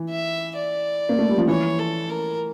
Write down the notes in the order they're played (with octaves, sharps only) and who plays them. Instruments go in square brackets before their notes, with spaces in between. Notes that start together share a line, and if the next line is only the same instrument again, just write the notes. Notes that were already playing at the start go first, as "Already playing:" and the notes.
Already playing: [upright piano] E3
[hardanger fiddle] E5
D5
[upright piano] A#3
A3
G3
F3
[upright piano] E3 [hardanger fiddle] C#5
[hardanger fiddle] A4
A#4